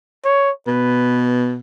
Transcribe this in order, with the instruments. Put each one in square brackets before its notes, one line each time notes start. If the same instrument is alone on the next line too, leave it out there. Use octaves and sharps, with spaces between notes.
[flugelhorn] C#5
[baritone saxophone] B2 [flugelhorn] B4